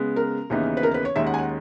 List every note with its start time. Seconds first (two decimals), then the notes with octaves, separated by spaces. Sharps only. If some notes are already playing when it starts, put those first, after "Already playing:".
Already playing: C#3 G#3 B3
0.16 A#4
0.50 D#2 C#3 E3 B3 D#4
0.77 B4
0.83 A#4
0.94 B4
1.05 C#5
1.16 D#2 D#3 G#3 C#4 E5
1.26 F#5
1.34 G#5
1.38 F#5